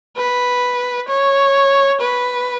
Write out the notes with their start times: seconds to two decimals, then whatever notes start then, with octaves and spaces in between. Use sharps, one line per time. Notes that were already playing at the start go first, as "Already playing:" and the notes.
0.17 B4
1.09 C#5
2.01 B4